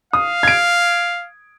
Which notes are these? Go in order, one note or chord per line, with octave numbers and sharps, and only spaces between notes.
F5 D#6
G#6 D7